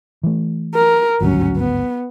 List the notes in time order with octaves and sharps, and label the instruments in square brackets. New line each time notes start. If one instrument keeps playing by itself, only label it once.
[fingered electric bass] E3 A3
[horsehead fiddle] A#4
[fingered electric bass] G#1 D2 G2 [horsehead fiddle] F#3 C#4
[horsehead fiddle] B3